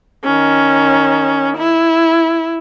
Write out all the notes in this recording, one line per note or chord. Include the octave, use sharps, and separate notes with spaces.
D#3 C#4
E4